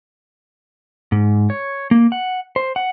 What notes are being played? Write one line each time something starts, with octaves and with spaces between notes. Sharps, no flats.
G#2
C#5
A#3
F#5
C5
F#5